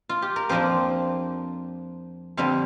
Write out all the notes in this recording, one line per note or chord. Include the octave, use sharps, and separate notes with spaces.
F4
G4
A#4
F2 F3 A#3 D4 C5
F2 D3 G3 C4 F5